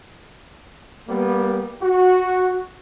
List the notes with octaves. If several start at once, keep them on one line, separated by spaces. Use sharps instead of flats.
G3 A#3 B3
F#4